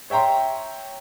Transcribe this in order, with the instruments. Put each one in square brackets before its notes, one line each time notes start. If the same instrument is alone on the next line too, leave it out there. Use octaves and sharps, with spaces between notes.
[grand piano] C#5 E5 G5 A#5 C6